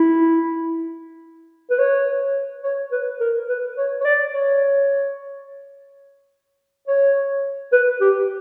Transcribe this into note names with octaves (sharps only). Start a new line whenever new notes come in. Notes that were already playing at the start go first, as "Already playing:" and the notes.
Already playing: E4
B4
C#5
C#5
B4
A#4
B4
C#5
C#5
D5
C#5
C#5
B4
G4